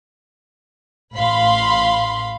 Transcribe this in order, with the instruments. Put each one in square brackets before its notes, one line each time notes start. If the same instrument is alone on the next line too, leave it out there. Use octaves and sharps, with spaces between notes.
[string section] A1 F5 B5 C6